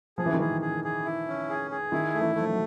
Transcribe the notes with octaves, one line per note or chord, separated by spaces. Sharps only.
F3 G#4
E3
D#3
E3 G#4
G#4
G#4
E4
C#4
G#4
G#4
D#3 E4
A3
E3
F3 A3
F#3